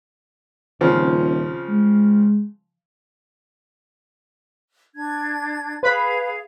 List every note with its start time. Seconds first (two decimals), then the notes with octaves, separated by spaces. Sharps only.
0.81 D#1 C#3 F3 C4
1.69 G#3
4.94 D4 G#6
5.83 G#4 B4 F5 B5